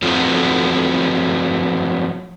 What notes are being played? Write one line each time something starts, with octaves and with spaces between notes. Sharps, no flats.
F3 F#3 A3 B3 C4 F4